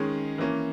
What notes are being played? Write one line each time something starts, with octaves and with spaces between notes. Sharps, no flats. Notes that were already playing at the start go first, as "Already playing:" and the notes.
Already playing: D#3 G#3 C#4 G#4
E3 A#3 C#4